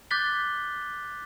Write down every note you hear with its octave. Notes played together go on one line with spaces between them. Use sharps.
D6 F#6 G6 A6 B6 G7